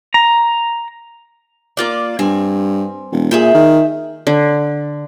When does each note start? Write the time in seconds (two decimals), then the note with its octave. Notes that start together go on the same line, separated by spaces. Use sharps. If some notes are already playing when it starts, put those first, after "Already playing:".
0.14 A#5
1.77 A#3 F4 D5
2.19 G2 C4 G#5
3.12 E1
3.31 A#2 G#4 E5 G5
3.54 D#3
4.27 D3